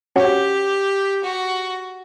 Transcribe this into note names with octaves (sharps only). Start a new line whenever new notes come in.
C#4 F#4 G4 C#5 F#5
F#4